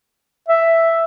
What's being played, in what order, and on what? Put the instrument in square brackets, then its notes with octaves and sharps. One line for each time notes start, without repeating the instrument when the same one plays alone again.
[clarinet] E5